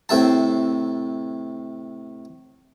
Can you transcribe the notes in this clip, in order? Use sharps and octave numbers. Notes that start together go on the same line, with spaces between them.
A2 C3 E5 A5